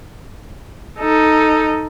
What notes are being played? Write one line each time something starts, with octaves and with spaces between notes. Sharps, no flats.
D#4 A4